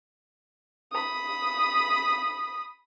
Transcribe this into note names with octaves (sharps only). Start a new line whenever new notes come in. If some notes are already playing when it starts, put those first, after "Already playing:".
B5 D#6